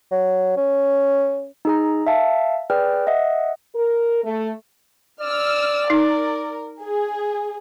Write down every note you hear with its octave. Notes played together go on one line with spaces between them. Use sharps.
F#3
C#4
D#4 G#4 A#5
E5 F5 A5
G#4 B4 D5 G5 F6
D#5 E5 F#5
A#4
A3
D5 E6 F6
D#4 A#4
G#4